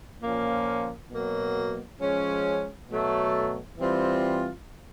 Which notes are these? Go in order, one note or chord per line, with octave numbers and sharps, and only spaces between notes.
A#2 F3 A#3 C#4
B2 F#3 A#3
F3 G#3 C#4
B2 F#3 A3
E3 G3 C4 F4